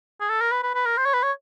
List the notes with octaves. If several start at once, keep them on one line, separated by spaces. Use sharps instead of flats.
G#4
A4
A#4
B4
B4
B4
A#4
C5
C#5
B4
C#5